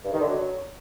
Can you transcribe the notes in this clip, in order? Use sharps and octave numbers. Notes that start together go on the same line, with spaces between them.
G2
D#3
D3
F#3